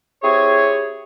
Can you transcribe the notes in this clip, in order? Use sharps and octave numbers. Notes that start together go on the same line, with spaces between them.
C4 E4 G4 G#4 C#5